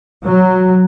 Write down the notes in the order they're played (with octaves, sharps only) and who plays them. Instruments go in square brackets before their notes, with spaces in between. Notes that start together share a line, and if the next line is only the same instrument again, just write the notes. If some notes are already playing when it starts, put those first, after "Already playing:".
[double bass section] F#3